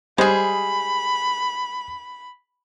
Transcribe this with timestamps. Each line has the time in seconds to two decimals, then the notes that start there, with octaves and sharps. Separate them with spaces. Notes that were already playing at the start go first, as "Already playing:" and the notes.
0.18 G3 G#3 G#4 C5 B5